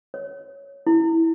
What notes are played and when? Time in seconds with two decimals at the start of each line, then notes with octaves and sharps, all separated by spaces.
0.14 C#5
0.87 E4